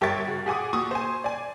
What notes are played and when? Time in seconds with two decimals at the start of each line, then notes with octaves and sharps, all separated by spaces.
0.01 G1 G4 A#4 E5 C#6 A6
0.27 C#3 F#4
0.46 G4 G#4 F#5 G#5 D6 D#6
0.73 A#2 F#4 C#6 D#6
0.91 C5 G#5
1.24 D5 G#5